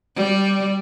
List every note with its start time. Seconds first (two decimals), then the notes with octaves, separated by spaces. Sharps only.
0.16 G3